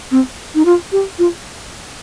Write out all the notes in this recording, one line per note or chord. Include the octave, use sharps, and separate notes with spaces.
C4
D#4
F4
G4
F4